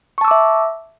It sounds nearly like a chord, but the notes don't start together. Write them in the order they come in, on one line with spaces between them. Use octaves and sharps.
C#6 A5 E6 D6 E5